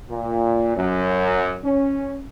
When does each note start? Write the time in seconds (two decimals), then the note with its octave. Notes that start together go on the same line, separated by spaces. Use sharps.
0.10 A#2
0.77 F#2
1.65 C#4